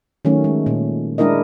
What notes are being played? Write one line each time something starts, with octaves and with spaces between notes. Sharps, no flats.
D#3 F#3 A3 C#4
G#3
A#2
G#3 D4 E4 A#4 D#5